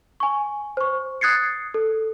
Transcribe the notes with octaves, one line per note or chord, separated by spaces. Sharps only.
G#5 C#6
C5 C#6
D#6 F#6 G#6 A6 C7 C#7
A4